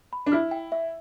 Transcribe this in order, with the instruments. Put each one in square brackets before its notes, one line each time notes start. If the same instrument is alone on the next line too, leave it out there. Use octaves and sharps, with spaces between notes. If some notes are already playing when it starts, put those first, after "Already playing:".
[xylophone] B5
[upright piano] D4
[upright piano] E4 [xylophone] F6
[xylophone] G5
E5